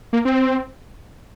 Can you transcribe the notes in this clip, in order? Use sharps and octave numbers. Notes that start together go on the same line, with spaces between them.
A#3
C4